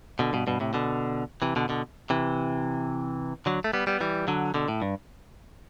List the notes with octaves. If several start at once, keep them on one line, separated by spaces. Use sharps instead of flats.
B2 D3
G2 B2
G2 B2
A2 C3
B2 D3
C3 E3
B2 D3
B2 D3
C3 E3
D3 F#3
A3
G3 B3
G3 B3
E3 G3
D3 F#3
B2 D3
A2
G2